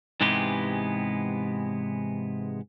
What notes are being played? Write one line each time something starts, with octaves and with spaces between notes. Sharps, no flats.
G#2 C3 E3 G#3 B3 G4